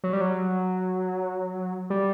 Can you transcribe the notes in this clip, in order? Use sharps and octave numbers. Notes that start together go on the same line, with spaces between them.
F#3
G3
F#3
G3